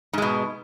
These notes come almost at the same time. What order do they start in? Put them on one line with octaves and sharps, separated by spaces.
G#2 G#3 B2